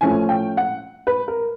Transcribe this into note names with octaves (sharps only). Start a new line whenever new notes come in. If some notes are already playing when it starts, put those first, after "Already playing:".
A2 F3 A3 C#4 G#5
G5
F#5
B4
A#4